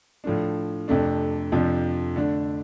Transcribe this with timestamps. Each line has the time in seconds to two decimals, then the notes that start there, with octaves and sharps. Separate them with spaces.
0.24 A2 F3 A3 D4
0.88 F2 C3 A3 D4
1.52 F2 C3 F3 D4
2.16 D3 A3 D4